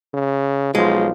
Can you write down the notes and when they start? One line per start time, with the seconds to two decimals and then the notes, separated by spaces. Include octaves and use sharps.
0.14 C#3
0.75 B1 F3 G#3